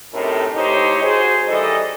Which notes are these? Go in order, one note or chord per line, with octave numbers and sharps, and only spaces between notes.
F#2 A2 C3 D#4 A4 A#4
A2 D#4 G4 C5 C#5 D#5
F#4 G#4 C5
D#3 E3 G3 A4 D#5